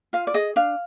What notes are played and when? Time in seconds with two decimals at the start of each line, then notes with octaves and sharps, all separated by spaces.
0.13 F4 F5
0.27 D5
0.34 G#4 D#5
0.56 D4 F5